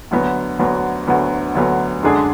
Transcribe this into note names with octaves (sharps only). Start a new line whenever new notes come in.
D2 D3 F#3 B3
D2 D3 F#3 B3
D2 D3 F#3 B3
D2 D3 F#3 B3
F#2 D3 G#3 D4 G#4